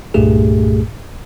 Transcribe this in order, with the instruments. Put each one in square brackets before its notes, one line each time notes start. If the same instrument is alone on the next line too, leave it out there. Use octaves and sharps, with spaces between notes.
[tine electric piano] C2 G2 A#2 A3 G4 G#4